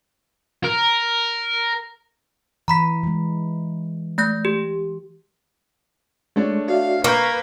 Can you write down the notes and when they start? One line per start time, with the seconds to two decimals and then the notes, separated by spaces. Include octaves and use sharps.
0.64 A#4
2.68 E3 A#5 B5 B6
3.03 E3 G#3
4.18 A3 G6 A#6
4.45 G4
6.36 G#3 A3 D4 C#5
6.68 F#4 D5 E5 F5
7.04 A#3 B4 C#6 F6 G6 G#6